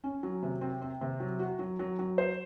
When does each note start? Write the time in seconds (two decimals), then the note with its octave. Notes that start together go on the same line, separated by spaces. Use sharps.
0.04 C#4
0.23 F#3
0.42 C3
0.61 C4
0.81 C4
1.01 C3
1.20 F#3
1.39 F#4
1.59 F#3
1.79 F#3
1.99 F#3
2.18 C5